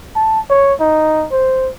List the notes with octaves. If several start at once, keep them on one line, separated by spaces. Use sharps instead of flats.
A5
C#5
D#4
C5